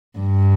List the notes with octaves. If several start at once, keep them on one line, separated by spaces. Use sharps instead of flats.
G2